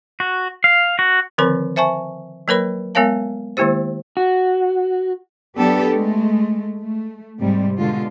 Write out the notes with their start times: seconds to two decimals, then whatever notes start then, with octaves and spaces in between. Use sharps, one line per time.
0.20 F#4
0.64 F5
0.99 F#4
1.38 D3 D#3 F3 C4 A#4 B5
1.76 C5 E5 G#5 A5 C#6
2.48 F#3 A#3 A#4 B4 C#5 B5
2.95 G#3 B3 A#4 C#5 F5 A5
3.57 D#3 G#3 A#3 E4 G4 C5
4.17 F#4
5.57 F#3 B3 D4 G4 A4
5.93 G#3 A3
6.79 A3
7.39 G#2 C3 G3
7.78 B2 D3 G#3 F4